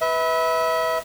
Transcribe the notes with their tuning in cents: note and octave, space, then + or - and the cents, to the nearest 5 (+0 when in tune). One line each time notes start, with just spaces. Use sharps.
B4 +0 E5 -30